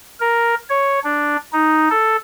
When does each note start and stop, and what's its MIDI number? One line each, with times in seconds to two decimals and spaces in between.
0.20 0.55 70
0.70 1.00 73
1.04 1.36 62
1.53 1.89 63
1.90 2.17 69